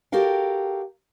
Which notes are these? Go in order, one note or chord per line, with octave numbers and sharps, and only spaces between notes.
F#4 G4 A4 A#4 F5 G5